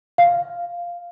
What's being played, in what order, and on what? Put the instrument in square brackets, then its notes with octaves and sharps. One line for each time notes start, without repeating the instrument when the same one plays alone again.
[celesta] F5